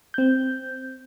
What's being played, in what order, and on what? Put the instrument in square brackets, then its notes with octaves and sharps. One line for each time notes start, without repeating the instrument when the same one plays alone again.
[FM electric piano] C4 G6